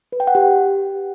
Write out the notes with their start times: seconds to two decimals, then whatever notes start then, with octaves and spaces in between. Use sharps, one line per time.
0.12 B4
0.20 G5
0.27 F#5
0.35 G4